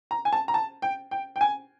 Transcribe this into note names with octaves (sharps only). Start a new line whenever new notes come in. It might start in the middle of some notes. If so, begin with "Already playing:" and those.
A#5
G#5
A5
A#5
A5
G5
G5
G5
G#5